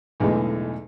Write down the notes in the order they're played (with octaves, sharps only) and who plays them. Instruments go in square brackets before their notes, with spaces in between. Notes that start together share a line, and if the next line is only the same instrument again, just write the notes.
[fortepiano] B1 E2 A2 D3 E3 G#3